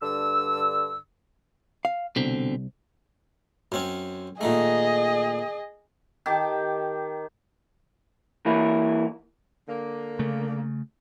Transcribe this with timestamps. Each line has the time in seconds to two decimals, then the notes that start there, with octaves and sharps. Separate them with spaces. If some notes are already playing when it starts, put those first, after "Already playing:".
0.02 G2 D3 E6
1.85 F5
2.16 C2 B2 D3 C4
3.72 F#2 C4 C#4
4.41 A#2 D#3 A3 G#4 D#5
6.26 D#3 G4 A5
8.46 E3 A#3 E4
9.69 D3 A#3
10.19 C#3 A3